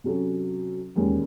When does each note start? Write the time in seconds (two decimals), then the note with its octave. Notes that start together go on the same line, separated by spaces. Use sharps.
0.04 C3 F#3 C#4 F#4 A4
0.96 E1 D#2 D#3 G#3 C#4